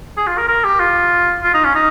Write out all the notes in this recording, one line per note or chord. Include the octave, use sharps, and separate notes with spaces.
G#4
F4
A#4
A#4
G4
F4
F4
D#4
C#4
D#4